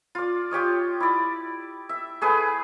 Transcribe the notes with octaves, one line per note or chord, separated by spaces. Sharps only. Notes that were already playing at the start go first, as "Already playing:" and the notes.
F4 D5
F4 G4 C#5 D#5
E4 D5
E5
A3 G#4 B4